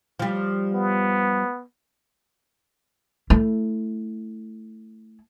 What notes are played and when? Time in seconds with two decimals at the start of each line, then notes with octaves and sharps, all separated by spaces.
0.19 F3 G3
0.74 B3
3.30 A3 E4